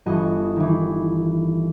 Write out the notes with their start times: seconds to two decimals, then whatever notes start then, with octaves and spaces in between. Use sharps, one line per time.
0.06 G1 E3 F#4 D#5
0.56 D#3 E3